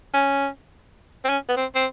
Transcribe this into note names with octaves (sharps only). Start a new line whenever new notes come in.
C#4
C4
C#4
B3
C4
C4